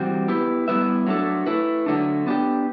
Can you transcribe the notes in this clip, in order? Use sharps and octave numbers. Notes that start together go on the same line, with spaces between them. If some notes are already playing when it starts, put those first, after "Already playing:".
Already playing: E3 G3 C4 F#4
B3 E4 G4 B4
G3 B3 E4 B4 E5
F#3 A3 D4 A4
A3 E4 B4
D3 F#3 A3 D4
B3 D4 G4